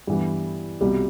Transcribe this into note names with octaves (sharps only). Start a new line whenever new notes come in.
G2 E3 G3 B3
C2 B2 G3